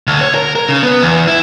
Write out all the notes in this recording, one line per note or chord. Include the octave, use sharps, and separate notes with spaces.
D2
C#5
A#4
A#4
C#3
B3
E2
E4